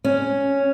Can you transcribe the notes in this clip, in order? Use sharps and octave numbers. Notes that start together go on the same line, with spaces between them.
C#4